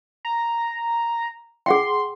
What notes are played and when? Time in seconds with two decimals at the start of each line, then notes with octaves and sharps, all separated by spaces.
0.25 A#5
1.66 G#4 F#5 G5 C6